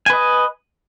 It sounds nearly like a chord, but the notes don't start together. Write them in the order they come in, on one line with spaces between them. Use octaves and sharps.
G#5 B4 D#5